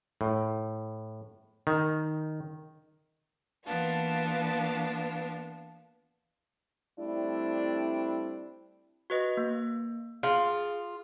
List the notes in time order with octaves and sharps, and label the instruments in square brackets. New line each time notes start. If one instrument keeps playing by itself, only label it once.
[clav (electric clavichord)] A2
D#3
[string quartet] E3 A#3 B3 D4 F4
[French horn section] G3 A3 C4 D4 E4
[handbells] F#4 B4 D#5
A#3
[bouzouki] F4 [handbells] G#4